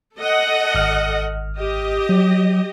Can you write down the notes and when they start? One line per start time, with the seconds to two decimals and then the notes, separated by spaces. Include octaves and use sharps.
0.18 A4 D#5 F#5
0.75 G#1 F6
1.58 G4 D#5
2.09 F#3